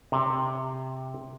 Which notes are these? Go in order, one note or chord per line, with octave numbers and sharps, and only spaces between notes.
C3